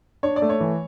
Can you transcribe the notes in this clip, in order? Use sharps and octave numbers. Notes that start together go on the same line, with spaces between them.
D4 C#5
D5
A3
C#5
E3